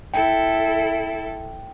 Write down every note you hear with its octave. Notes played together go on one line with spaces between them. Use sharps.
E4 A4 G5